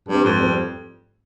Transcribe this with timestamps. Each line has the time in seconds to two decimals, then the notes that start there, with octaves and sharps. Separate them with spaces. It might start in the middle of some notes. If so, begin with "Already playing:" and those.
0.09 G2 G3 C4
0.24 F2 G#2
0.39 G3 C4